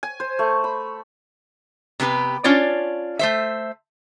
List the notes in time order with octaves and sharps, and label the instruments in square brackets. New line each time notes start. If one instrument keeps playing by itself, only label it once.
[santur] G#5
C5
A3
B5
[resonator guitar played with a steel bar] C3 B3 G4 B4
C#4 D4 F4 C#5 D5
A3 C5 E5